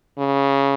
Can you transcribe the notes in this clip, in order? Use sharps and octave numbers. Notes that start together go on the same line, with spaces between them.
C#3